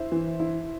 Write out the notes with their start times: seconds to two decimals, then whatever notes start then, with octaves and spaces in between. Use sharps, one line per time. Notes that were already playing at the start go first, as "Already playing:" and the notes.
Already playing: E4 C5 E5
0.12 E3
0.40 E4